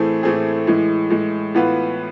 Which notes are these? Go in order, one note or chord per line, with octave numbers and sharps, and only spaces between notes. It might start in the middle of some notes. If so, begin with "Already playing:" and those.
Already playing: A2 E3 A3 C4 G#4
A2 E3 A3 C4 G#4
A2 E3 G#3
A2 E3 G#3
A2 E3 B3 F4 B4